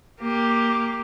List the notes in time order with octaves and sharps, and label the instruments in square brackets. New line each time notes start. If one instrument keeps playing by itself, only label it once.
[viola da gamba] A#3 G4